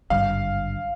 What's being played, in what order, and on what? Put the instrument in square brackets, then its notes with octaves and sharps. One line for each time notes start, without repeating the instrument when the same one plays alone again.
[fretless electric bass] G#1 G2 D3 [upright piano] F5